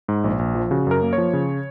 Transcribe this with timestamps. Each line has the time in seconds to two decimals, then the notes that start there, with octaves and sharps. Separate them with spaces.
0.08 G#2
0.24 A#1
0.39 A#1
0.55 F3
0.71 C#3 F#4
0.87 F#2 A#4
1.03 A#3
1.13 C#5
1.18 F3
1.33 C#3